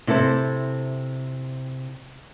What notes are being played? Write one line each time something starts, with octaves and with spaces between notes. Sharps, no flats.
C3 E4 A4 A#4 C5